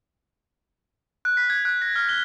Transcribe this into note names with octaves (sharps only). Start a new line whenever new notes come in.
F#6
B6
G#6
F#6
A#6
F6
G7